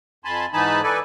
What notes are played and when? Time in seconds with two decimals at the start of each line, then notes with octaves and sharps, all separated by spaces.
0.25 F2 G#5 A5 B5 C6
0.53 G#2 E3 D#4 G#5 A5 B5
0.83 A4 B4 D5 G#5